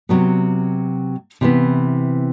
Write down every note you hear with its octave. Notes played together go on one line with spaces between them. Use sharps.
C3 F#3 B3
C3 E3 B3